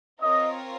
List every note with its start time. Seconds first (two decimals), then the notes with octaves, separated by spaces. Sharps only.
0.22 C4 F4 A#4 C#5 D#5